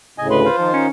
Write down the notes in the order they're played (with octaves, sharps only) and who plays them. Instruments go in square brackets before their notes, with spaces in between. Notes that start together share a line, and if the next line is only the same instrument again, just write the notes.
[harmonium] D2 A2 C#3 [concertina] D#5 G#5
[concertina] G#3 C6 [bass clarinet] B4
[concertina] F4 C5 F5
[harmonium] D#3 D#4 [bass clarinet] F3
[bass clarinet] C#4